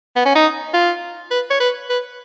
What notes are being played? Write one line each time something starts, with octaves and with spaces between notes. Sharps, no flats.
B3
C#4
D#4
F4
B4
C#5
B4
B4